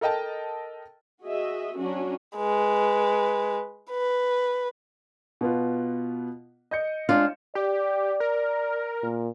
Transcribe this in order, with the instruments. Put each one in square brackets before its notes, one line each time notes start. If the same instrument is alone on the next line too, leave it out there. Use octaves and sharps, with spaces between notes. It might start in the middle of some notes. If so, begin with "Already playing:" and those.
[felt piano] A4 A#4 D#5 G5 A5
[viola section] F#4 G#4 D#5 E5
F#3 C#4 D4 F#4
[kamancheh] G#3 B4
B4
[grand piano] B2 B3 F4
D#5 G6 C#7
[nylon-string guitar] G#3 D4 F4
[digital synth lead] G4 [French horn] D5
[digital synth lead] A#4
[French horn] A#2